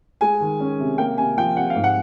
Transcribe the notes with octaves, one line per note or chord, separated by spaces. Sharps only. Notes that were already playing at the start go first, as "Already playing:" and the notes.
G#3 G#5
D#3
C#4
C3
A#3 G5
C3 G#5
F3 G5
C3 F#5
F5
G#2
F#5